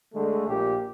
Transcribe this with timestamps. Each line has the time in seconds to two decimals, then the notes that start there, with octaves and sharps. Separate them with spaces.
0.14 D3 G#3 A3
0.48 A#1 A#2 G4